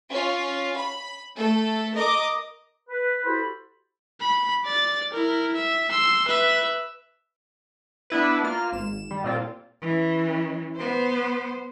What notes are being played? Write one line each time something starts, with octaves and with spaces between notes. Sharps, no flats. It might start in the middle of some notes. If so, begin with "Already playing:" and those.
C#4 F4
B5
A3 A4
A#4 D#5 D6
B4
E4 F#4 G4 A4 C5 B5
B5
D5 A6
E4 A#4
E5
C6 E6
B4 E5
B3 D4 E4 B4
A#3 F4 F6
G#1 E7
G3
A#2 C4 F4
E3 C#4
B3 C5